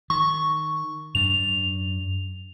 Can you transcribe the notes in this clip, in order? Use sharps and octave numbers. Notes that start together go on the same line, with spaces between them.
D#3 C#6
F#2 D4 F7